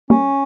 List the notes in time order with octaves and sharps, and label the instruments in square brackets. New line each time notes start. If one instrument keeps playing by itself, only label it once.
[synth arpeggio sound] G3 A#3 [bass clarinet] C#4